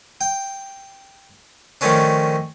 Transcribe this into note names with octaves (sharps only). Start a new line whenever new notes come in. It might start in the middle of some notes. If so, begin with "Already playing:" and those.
G5
D#3 F3 A3 C#4 D4